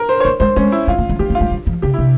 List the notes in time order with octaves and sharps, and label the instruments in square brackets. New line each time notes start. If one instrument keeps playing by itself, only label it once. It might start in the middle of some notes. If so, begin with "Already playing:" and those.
Already playing: [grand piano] A#4
C5
C#5
[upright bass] A#3 [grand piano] C5
[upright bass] G#3 [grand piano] C5
[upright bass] G#3 [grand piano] C#4
[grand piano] E4
[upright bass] G3 [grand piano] F4
[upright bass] A#3
G#3
[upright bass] A#3 [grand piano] G4
[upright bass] A#3
[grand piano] F4
[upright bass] G#3
G3
F3
[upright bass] C#3 [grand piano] G4
[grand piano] E4
[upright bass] C3